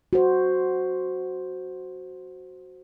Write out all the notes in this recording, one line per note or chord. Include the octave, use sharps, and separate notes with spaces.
F#4 C5